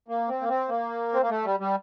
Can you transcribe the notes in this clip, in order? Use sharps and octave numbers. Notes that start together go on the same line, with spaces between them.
A#3
C4
A#3
C4
A#3
C4
A#3
A3
G3
G3